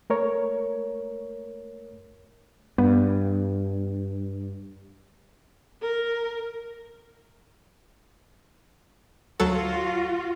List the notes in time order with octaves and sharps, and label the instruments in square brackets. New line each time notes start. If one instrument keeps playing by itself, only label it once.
[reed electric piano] A3 A#4 C#5
[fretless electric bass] G2 [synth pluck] B3
[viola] A#4
[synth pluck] D2 F#3 A4 [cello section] F4 F#4